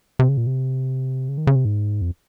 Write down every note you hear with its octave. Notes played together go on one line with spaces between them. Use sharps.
C3
C#3
A#2
C3
C#3
D#3
C#3
C3
G#2
F2